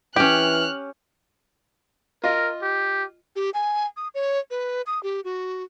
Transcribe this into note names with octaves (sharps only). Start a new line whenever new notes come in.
E3 C#4 G4 G5 F6 F#6
F4 A#4 D#5
G4
G4
G#5
D#6
C#5
B4
D#6
G4
F#4